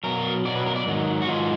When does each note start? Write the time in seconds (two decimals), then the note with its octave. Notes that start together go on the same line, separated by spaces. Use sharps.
0.04 B2 F#3 A#4
0.45 B2 F#3 D5
0.55 B4
0.66 A#4
0.76 D5
0.86 G#2 D#3 F#3
1.22 F#4
1.27 G#2 D#3 F#3 F4